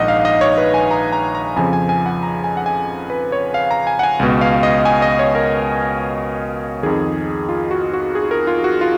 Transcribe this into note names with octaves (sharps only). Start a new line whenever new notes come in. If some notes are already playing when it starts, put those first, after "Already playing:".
Already playing: A#1 G#2 D#3 D#5 F#5
F5
D#5
C#5
B4
G#5
A#5
A#5
A#5
F2 C#3 F3 G#5
G#5
G#5
F#5
A#5
G#5
F#5
G#5
B4
C#5
F5
A#5
G#5
F#5
G#5
C#2 B2
F5
D#5
G#5
D#5
C#5
A#4
F2 D#3 G#4
F4
F#4
F#4
G#4
A#4
F4
F#4
F4